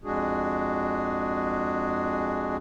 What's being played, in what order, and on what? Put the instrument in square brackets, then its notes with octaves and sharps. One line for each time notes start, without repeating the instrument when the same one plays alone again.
[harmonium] F2 G#3 D4 F#4 G#4